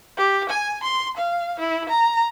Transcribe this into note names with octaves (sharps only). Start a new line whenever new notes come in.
G4
G#5
C6
F5
E4
A#5